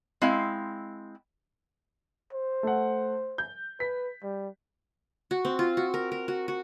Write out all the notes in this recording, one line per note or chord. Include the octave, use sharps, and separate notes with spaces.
G#3 C4 E4 F5
C5
A3 F#5
G6
B4 B6
G3
F#4
C4
F4
F#4
A#4
A#4
F#4
F#4